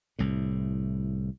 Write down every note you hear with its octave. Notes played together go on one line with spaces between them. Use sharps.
C2 A2